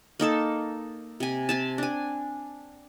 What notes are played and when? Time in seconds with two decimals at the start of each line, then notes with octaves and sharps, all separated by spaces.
0.20 A#3 D#4 A4 A5
1.20 C3 G#5
1.49 C4 G#5 A5
1.78 D4 G#5